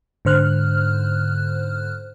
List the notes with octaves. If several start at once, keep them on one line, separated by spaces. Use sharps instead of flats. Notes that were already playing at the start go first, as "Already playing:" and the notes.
G#2 D3 C5 F6 F#6